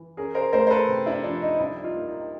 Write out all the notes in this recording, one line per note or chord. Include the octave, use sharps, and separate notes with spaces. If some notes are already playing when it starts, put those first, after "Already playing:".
Already playing: E3
C#4 G#4 A#4
A#4 C5
A3 A#4 C5
C5
A4 B4
C3
D4 E4
F3 D4
D#4
C2 D4 E4
D#4 F4
A#3
D#4